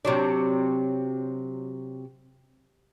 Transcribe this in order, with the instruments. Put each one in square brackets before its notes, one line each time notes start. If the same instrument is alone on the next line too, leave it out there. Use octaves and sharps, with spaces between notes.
[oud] C3 F#3 D4